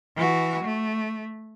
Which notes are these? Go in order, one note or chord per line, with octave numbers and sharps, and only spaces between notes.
E3 F#4
A3